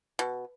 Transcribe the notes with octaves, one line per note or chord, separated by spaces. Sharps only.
B2